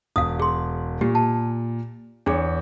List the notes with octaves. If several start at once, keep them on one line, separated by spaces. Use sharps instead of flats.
E1 F5 D#6
G#4 C6
A#2 G4
A5
E2 D4 G#4 C#5